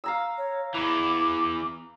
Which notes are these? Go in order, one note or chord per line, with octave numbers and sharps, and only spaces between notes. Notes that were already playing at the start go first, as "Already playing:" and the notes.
F5 A#5 E6
C#5
E2 E3 D6